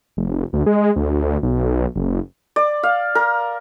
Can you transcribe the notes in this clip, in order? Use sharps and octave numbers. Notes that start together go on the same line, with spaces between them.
F1
D2
G#3
D2
B1
F#1
D5
F5
A#4